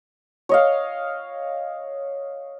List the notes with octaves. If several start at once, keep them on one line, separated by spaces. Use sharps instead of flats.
C#5 D#5 F5